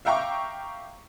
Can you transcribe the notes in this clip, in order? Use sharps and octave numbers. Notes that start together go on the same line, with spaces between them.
E5 F5 G5 A#5 C#6 D6